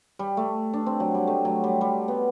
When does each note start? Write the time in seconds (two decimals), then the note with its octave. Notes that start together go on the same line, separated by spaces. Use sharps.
0.19 G3
0.37 A3
0.73 D4
0.86 C4
1.00 F#3
1.14 G3
1.27 A3
1.45 F#3
1.64 G3
1.81 G3
2.08 B3